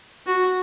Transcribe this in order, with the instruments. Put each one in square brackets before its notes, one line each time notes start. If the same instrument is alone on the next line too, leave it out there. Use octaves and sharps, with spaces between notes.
[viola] F#4